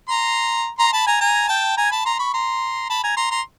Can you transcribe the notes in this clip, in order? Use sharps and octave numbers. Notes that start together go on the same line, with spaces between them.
A#5 C6
A#5 C6
A5 B5
G#5 A#5
G#5 A#5
G5 A5
G#5 A#5
A5 B5
A#5 C6
B5 C#6
A#5 C6
A5 B5
G#5 A#5
A#5 C6
A#5 C6